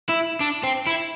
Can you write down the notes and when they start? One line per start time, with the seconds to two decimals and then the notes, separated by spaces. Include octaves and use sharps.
0.09 E4
0.40 D4
0.63 C4
0.87 E4